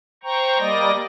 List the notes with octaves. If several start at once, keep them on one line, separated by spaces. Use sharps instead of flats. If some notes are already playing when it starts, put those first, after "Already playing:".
C5 G5 A#5 C#6
G3 A#3 D5 D#5 A#6